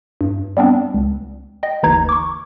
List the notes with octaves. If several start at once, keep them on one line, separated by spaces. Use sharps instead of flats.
G2
G3 B3 C4 D4
C#2
D#5 G5
G1 D#2 E3 D#4 A#5 G#6
C#6 D6